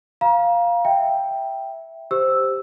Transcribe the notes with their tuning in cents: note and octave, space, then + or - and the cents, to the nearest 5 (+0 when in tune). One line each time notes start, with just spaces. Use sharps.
F5 +0 A#5 +30
E5 +0 G5 +0
G4 +0 C5 +0 E6 +0